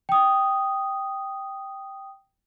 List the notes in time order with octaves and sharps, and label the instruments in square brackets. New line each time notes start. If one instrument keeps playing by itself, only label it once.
[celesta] G5 D#6